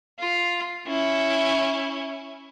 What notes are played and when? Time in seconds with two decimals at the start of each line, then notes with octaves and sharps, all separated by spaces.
0.20 F4
0.87 C#4 E4